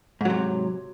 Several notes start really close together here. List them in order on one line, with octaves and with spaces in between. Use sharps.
G#2 F#3 C3